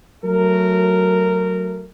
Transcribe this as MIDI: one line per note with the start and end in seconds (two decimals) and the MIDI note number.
0.25 1.86 54
0.25 1.86 57
0.25 1.86 70